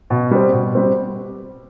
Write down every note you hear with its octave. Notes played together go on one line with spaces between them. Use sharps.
B2
G3 C4
B2
G3 C4